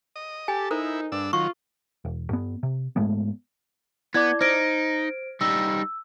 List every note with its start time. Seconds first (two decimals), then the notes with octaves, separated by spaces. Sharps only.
0.16 D#5
0.48 G4 A4 G#5
0.71 D#4 E4 A4 A#4 C5
1.12 G2 D4 E6
1.33 D#3 F#3 F4 C#6
2.05 E1
2.30 G2 B3
2.63 C3
2.96 G#2 G#3 A3 B3
4.14 B3 E4 D5 D6 G#6
4.41 D#4 C5 F6 G#6 A#6 D7
5.41 G3 D#4 E6